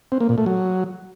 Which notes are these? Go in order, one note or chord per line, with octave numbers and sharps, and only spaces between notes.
C4
A#3
A#2
A3
F#3